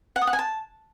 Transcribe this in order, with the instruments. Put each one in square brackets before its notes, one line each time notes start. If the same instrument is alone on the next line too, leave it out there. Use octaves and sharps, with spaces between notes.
[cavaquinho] F#5
D#6
F#5
G#5
A5